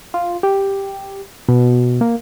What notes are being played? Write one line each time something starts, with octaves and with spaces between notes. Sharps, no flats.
F4
G4
B2
A#3